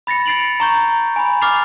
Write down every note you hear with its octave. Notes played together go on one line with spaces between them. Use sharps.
B5 A6 A#6 C#7
A6 C7 D7 F7 F#7
A#5 C#6 G6
G#5 B5
D6 F6 A6 C7 F7